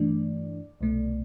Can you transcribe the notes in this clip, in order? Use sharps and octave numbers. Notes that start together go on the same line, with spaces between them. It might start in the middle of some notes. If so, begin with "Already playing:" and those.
Already playing: G2 E3 A3 D4 D5
C2 B2 A3